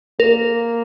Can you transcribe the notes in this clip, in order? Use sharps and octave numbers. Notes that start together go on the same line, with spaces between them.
A#3 A#4